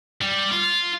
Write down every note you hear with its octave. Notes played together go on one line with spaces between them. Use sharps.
G3
F4